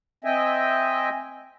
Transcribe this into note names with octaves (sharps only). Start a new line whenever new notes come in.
C4 D#5 E5 G5 G#5